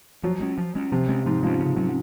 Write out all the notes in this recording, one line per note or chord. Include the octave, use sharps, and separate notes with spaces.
F3 F#3
G#3 C#4
F3
G#3 C#4
C3 F3
G#3 C#4
G#2 F3
F3 G#3 C#4
C#3
F#3 C#4